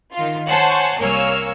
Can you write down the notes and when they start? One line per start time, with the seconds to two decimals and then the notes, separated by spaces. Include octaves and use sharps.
0.13 D#3 F4
0.47 C5 C#5 F#5 G#5 A5 C6
0.99 C2 A#3 C#5 G#5 E6 F6